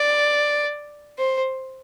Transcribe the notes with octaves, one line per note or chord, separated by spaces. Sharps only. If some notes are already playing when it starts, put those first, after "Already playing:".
Already playing: D5
C5